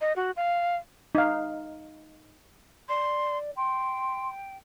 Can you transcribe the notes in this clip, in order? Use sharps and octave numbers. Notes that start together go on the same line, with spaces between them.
D#5
F#4
F5
D#4 F5
D5 C6
G5 C6